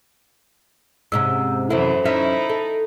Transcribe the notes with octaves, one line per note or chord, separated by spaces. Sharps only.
G#2 C3 C#4 E6
F#2 C3 E3 E4 A4 C5
F#2 C#4 D#4 E4 E5
A4